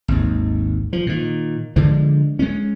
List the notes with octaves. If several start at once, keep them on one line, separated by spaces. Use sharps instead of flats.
G#1 D#2
F3
A#2 D#3
D3 F3 G#3
G#3 C#4